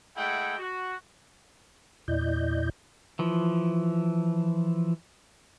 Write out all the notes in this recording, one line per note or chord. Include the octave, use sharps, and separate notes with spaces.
G#3 A3 E4 F#5 G5
F#4
E2 A#2 E4 D5 D#5 G6
E3 F3